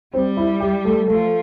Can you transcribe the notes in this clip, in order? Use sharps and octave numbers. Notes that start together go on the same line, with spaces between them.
G3 C4
E4
G4
A3
F3 A3